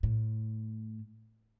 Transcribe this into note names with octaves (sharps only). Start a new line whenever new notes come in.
A2